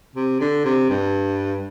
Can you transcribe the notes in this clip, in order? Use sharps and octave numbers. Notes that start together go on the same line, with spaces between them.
C3
D3
C3
G2